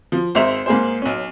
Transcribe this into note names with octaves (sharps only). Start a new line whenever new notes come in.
F3
G#1 G#3 C5 E5 F7
G#2 A#3 G#4 C5
B1 C#4